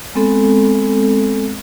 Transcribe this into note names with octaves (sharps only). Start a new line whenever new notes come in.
G#3 B3 C4 A4